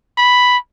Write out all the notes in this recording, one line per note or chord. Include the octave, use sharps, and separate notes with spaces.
B5